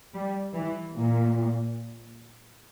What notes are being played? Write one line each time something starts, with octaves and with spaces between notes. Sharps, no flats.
G3
E3
A#2